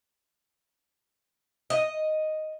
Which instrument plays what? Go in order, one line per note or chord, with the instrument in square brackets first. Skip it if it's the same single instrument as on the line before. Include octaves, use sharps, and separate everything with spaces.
[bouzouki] D#5